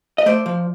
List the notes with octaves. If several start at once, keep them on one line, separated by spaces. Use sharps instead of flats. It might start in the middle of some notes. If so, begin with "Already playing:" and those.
D#5
A3 C5 D5
F3